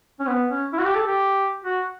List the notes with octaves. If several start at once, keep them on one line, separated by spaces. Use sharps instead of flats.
C#4
B3
C#4
E4
F#4
G4
A4
G4
F#4